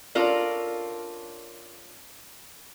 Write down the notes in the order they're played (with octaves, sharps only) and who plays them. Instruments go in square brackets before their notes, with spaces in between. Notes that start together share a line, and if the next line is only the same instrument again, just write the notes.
[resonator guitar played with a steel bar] C#4 D4 F4 A4 A#4 D5